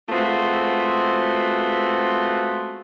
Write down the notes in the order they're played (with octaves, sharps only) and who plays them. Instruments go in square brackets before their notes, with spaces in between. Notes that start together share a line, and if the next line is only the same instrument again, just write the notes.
[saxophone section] G#3 A3 B3 C4 F4 F#4